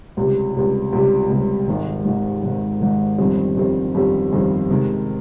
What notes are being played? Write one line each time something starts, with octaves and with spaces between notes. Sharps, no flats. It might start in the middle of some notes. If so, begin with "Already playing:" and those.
C#2 C3 G3
C#2 C3 G3
C#2 C3 G3
C#2 C3 G3
G#1 G#2 D#3
G#1 G#2 D#3
G#1 G#2 D#3
G#1 G#2 D#3
G1 F2 D#3 G3 C4
G1 F2 D#3 G3 C4
G1 F2 D#3 G3 C4
G1 F2 D#3 G3 C4
C3 D#3 G#3